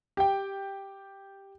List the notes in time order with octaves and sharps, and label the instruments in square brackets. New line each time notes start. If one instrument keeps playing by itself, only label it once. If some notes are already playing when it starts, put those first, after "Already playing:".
[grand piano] G4 G5